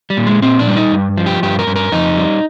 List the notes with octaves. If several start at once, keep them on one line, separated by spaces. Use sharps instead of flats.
G3
A#2
G#3
A#2 C4
D4
G3
D#4
G2
F3
G4
G2 G4
A#4
G2
A#4
F2 D#4
G3